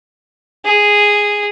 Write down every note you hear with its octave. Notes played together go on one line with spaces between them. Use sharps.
G#4